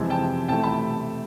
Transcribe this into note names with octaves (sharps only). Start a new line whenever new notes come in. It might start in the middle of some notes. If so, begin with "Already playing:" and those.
Already playing: F2 C3 E3 G#3
G5 A5
C3 E3 A3 G5 A5
A5 B5